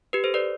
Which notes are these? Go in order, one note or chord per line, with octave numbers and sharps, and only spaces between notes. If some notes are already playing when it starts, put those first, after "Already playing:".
G4 B4
A4 C5
B4 D5